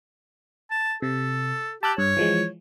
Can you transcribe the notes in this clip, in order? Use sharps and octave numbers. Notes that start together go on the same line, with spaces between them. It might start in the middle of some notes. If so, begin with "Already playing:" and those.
A5
C3 A4
G4 A5 E6 F#6
G2 C#5
E3 F3 G#3